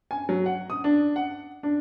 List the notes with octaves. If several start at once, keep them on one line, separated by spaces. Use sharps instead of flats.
G#5
F#3
F#5
D#6
D4
F#5
D4